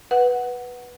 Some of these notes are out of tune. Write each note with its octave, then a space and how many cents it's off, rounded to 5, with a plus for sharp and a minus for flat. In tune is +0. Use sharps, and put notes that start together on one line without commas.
B4 -5 F#5 +0